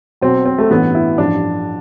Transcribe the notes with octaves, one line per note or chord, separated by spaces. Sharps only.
B1 B2 C4
C4
A3
A1 G2 E3 B3
E4
A1 G2 F3 D4